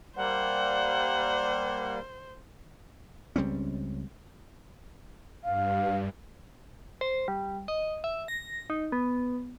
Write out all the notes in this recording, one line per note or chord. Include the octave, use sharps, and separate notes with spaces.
G3 A#3 C5 F#5
C#2 G3 C4 C#4
G2 F5
C5
G3
D#5
E5
A#6
D#4
B3